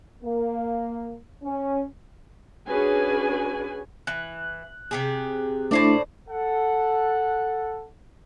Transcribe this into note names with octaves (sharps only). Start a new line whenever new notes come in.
A#3
C#4
C#4 D4 F#4 G#4 B4 G#5
E3 F#6
C3 G4 G#4
A2 A3 D4 E4 C5 D5
A4 F#5